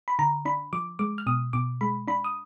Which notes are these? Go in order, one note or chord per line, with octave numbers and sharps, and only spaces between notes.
B5
D3 A#5
D4 B5
F3 D6
G#3 D6
F6
B2 D#6
B2 D6
G#3 B5
D4 B5
D#6